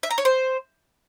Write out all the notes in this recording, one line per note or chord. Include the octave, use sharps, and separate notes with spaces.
E5
A#5
C#5
C5